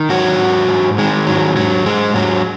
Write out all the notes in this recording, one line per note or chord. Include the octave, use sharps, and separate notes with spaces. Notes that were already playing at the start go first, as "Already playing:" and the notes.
Already playing: D#3
G#2 F#3 F#4
G#2
G#2
D#3 G#3
G#2 F#3
G#2 F#3
G#2 G#3
G#2 F#3